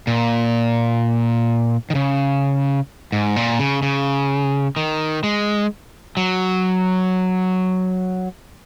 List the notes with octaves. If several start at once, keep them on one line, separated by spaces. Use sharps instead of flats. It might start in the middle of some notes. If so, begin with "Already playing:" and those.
A#2
D#3
C#3
G#2
A#2
C#3
C#3
D#3
G#3
F#3